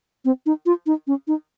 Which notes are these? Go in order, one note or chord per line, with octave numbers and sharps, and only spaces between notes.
C4
D#4
F4
D#4
C#4
D#4